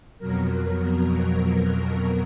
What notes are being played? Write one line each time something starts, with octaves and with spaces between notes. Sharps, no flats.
F2 B2 F#3 A#4